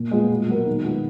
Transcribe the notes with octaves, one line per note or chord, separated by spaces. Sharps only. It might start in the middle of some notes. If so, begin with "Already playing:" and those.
Already playing: A#2
G#3 B3 F4
B2
F#3 B3 F#4 A#4
D#3
G#3 B3 F4